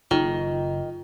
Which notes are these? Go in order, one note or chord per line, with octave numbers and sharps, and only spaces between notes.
F#1 D#3 F4